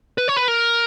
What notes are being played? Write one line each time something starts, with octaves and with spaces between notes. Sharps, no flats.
B4
C#5
B4
A#4